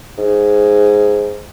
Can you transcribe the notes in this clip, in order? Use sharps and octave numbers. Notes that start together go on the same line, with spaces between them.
G#2